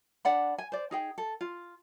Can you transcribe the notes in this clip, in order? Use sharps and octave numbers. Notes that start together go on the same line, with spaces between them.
D4 D5 F#5 B5
G#5
C5 D5
D#4 G#4 G5
A4
F4